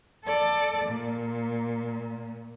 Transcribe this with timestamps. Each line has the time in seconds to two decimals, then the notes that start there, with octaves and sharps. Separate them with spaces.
0.24 A4 D5
0.85 A#2